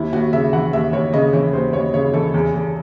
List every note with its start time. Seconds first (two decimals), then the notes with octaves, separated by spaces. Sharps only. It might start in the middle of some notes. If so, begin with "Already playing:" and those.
Already playing: D#2 E4
0.13 D#2 F#4
0.33 C#3 E5
0.53 E3 F#5
0.73 D#2 E5
0.93 D#2 C#5
1.13 C#3 D#5
1.33 E3 C#5
1.53 D#2 C5
1.73 D#2 C#5
1.94 C#3 C#5
2.13 E3 A4
2.34 E2
2.54 E2